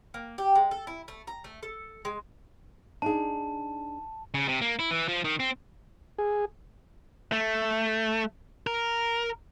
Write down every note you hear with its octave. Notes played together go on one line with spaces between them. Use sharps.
A#3
G4
G#3
A4
E4
A3
A#5
A3
A4
G#3
D4 D#4 G#4 A5
C#3
C3
A#3
E4
E3
F3
D#3
C4
G#4
A3
A#4